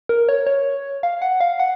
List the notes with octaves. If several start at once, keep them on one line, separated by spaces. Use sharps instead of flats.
A#4
C#5
C#5
F5
F#5
F5
F#5